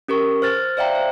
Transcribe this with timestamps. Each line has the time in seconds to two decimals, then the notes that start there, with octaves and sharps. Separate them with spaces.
0.08 C#4 G4 A#4 C#6
0.42 C5 F6 A6
0.77 C5 D5 E5 F5 G5 A#5
0.95 C5